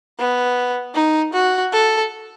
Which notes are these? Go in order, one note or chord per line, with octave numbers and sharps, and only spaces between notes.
B3
D#4
F#4
A4